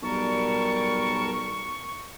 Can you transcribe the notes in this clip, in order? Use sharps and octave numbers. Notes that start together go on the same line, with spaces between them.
B1 G3 A#4 A5 C#6